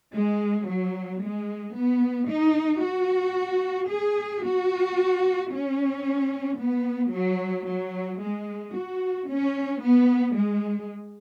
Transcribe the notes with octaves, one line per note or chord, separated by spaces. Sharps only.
G#3
F#3
G#3
B3
D#4
F#4
G#4
F#4
C#4
B3
F#3
F#3
G#3
F#4
C#4
B3
G#3